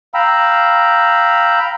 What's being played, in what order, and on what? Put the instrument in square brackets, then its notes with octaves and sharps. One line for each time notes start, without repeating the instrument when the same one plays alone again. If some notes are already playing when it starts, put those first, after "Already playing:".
[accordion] F5 G5 A#5 B5 E6